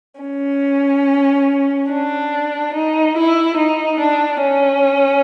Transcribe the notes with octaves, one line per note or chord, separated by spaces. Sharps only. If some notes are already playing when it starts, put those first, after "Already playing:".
C#4
D4
D#4
E4
D#4
D4
C#4